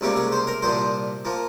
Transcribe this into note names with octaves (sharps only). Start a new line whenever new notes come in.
C#2 C3 G3 A#3 C#4
G#4
C5
A#4
C2 A#2 F3 C5
F3 A#3